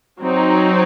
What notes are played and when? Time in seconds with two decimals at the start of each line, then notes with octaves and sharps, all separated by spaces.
0.20 F#3 C4 D#4